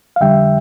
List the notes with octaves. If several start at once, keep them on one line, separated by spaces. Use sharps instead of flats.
F5
F2 D3 G3 E5 G5